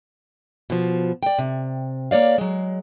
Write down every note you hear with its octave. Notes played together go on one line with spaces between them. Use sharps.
B2 F3
D5 G5
C3
A#3 C#5 D5 F5
F#3 G#3